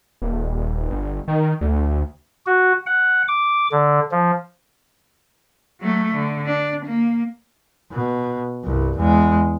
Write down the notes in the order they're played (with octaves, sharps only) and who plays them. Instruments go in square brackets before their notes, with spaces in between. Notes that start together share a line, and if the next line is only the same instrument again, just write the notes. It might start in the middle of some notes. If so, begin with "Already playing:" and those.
[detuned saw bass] D#1
G1
D#3
D2
[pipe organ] F#4
F#5
D6
D3
F3
[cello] F#3 A3
D3
D4
A#3
[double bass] B2
C2 G2
E2 G#3